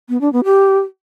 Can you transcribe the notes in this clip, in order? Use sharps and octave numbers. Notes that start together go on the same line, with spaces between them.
B3
D4
B3
G4